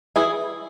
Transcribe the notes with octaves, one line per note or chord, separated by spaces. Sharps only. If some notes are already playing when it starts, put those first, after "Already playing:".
E3 E4 G#4